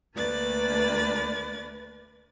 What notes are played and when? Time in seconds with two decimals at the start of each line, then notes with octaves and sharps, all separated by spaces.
0.15 D2 A3 A#3 B4 D5 A6